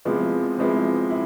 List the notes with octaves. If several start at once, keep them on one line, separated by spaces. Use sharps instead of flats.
C3 F3 G#3 B3 E4
C3 F3 G#3 B3 E4
E4